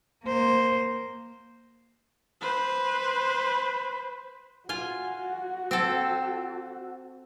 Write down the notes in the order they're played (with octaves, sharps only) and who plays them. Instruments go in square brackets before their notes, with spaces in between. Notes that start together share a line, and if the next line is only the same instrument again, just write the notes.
[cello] A#3 C5
[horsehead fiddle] B4 C5
[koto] F4 G#5 [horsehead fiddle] F#4
[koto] C4 A4